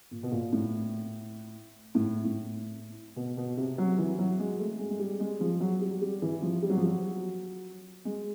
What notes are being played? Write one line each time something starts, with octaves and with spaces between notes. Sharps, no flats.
A#2
B2
A#2
A2
A2
A2
B2
B2
C3
F#3
E3
F#3
G#3
A3
G#3
G#3
G3
G#3
F3
F#3
G3
G3
E3
F3
G3
F#3
F3
F#3
G#3